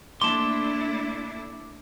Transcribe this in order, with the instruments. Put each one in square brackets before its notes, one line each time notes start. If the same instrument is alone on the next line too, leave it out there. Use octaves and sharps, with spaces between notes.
[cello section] A3 D4 E4 [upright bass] A#3 [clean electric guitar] A5 C6 [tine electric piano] D6